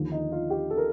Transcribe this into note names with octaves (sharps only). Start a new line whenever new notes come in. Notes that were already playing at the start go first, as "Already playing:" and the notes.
Already playing: D#2 D3 F3
D#4
F4
G4
A4
A#4